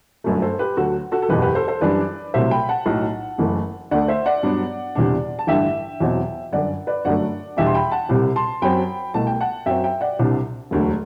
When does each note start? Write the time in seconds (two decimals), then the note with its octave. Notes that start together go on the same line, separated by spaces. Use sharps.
0.24 G1 F#2 F#3 A3
0.42 A4 C5
0.59 G4 B4
0.77 D2 D3 F#3 F#4 A4
1.12 F#4 A4
1.22 A4
1.29 F#1 E2 B2 G4 B4
1.42 G4 B4
1.55 A4 C5
1.68 A4 C5
1.81 F#2 E3 G3 D4 B4 D5
2.34 C2 C3 F#3 A3 C5 E5
2.51 G5 B5
2.69 F#5 A5
2.86 B1 A2 F#3
3.38 F#1 F#2 E3 A3
3.91 D2 D3 A3 D5 F#5
4.08 C5 E5
4.26 D5 F#5
4.43 G2 F#3 B3 D4
4.95 E2 C3 G3 D4
5.39 A5
5.47 A1 G2 D3 E5 G5
6.00 E2 B2 F#3 C4
6.52 G1 F#2 D3 D5 F#5
6.87 B4 D5
7.05 G1 F#2 D3 F#3 A3 D5 F#5
7.57 E2 B2 G3 D4 E5 G5
7.66 C6
7.74 G5 B5
7.91 F#5 A5
8.09 C2 C3 G3
8.36 A5 C6
8.62 F#2 F#3 C4 G5 B5
9.14 C2 B2 A3 A5
9.27 G5
9.40 F#5 A5
9.66 F#2 F#3 C4 E5 G5
9.84 E5 G5
10.01 D5 F#5
10.19 C2 C3 G3 D4
10.71 E1 D2 D3 F#3 A3